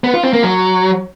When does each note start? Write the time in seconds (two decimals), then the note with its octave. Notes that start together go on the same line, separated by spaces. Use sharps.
0.04 B3
0.14 F4
0.23 C4
0.33 A#3
0.43 F#3